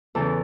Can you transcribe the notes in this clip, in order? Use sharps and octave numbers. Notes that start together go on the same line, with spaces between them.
E2 C#3 E3 A4